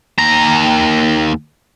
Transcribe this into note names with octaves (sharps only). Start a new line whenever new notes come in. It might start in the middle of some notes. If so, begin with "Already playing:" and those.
D#2 A#5